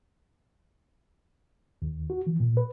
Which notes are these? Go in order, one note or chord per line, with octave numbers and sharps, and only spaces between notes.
D#2
F#4
E3
A#2
B4